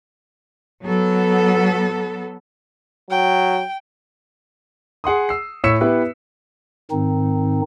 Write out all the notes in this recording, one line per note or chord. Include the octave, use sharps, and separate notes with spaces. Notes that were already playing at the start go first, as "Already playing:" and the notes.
F#3 B3 A4
F#3 G5
G#4 F#5 C6 D#6
E6 C7
A2 C#5 E6 B6 C#7 E7
B3 E4 G4 B4
G#2 D#3 C4 D#4